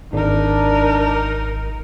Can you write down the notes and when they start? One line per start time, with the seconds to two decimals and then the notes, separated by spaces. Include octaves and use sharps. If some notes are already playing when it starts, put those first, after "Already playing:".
0.13 G#1 D4 D#4 A#4